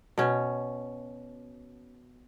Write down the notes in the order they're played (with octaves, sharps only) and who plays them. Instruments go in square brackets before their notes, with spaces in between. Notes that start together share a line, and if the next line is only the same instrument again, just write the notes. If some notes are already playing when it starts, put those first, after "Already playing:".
[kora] B2 C#4